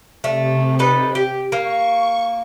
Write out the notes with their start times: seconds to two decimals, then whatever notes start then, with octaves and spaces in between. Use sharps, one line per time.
0.24 C3 A3
0.79 D#4 A4 B4
1.15 G4
1.52 A#3 C#6